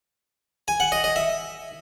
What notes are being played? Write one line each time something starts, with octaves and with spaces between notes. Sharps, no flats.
G#5
F#5
D#5
D#5
E5